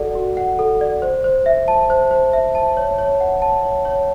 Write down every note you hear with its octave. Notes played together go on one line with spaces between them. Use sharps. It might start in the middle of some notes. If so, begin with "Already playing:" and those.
Already playing: F#4 A4 D5 F#5
F#4
F#5
A4
D5
C5
C5
E5
A5
C5
C5
E5
A5
C#5
C#5
F#5
A5
C#5
C#5